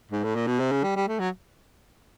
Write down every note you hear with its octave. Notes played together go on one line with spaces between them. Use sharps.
G#2
A2
A#2
B2
C3
C#3
G3
G3
A3
F#3